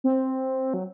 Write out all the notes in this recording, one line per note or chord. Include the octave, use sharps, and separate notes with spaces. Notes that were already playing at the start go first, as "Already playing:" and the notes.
C4
F#3